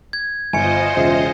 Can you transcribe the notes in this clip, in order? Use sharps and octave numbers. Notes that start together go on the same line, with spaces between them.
G#6
G1 F4 C5 D#5 G#5 C#7
E1 C#3 E5